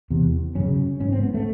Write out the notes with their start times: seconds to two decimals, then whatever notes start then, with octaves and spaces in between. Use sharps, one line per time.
0.10 E2 C3
0.55 F#2 C#3 C#4
1.00 G#2 C#4
1.12 C4
1.23 B3
1.34 A3